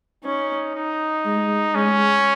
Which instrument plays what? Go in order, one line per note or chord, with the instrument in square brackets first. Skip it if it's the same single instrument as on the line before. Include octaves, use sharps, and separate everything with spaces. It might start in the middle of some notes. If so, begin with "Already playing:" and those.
[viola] C#4 [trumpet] D#4
[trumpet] D#4
[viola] G#3
[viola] G#3 [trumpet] C#4